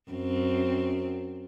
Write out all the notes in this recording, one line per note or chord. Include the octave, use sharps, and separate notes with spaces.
F#2 C4